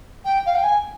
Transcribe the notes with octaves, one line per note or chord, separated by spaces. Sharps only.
G5
F5
G5
G#5